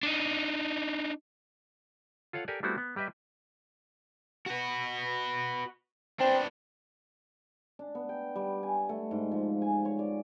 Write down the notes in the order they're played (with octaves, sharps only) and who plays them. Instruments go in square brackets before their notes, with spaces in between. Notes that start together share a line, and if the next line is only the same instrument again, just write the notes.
[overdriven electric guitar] D4 D#4
[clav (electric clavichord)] F4 A4 C#5 F5 F#5
G4 A4 A#4 D5 G#5
G3 A3 B3 C4 E4 F#4
B3
G3 G4 B4 D#5 E5
[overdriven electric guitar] F#4 B4
[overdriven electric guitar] B3 D4 [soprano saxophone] C4
[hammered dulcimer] D4
B3
G5
G3
G#5
A3
G#2
F3
G#5
C#5
D5